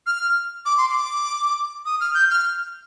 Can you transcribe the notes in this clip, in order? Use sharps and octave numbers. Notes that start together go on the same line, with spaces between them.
F6
D6
C6
D6
D#6
F6
G6
F6